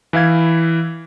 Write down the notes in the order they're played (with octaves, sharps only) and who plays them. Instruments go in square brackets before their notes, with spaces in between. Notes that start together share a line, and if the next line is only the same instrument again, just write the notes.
[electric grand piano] E3 E4 F5 G#6